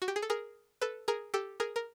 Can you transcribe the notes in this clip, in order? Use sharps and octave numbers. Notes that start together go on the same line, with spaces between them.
F#4
G4
G#4
A4
G#4 A#4
A4 B4
G#4 A#4
G4 A4
G#4 A#4
A#4